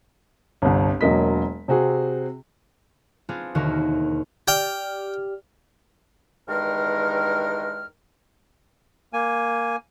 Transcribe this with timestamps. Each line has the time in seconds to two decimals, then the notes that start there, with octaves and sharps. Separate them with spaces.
0.62 G1 C2
1.01 E1 F#3 A#3 D#5 B6
1.68 C3 C4 F#4 G#4
3.29 B3 C4 D4 F4 G#4
3.55 E1 D#2 D3 D#3 F#4 A#4
4.48 G4 D5 G5 F6
6.48 E2 G2 D#3 G#3 A#4 F6
9.13 A#3 G#5